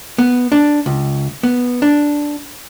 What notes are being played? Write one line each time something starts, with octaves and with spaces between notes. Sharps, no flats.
B3
D4
C#2
B3
D4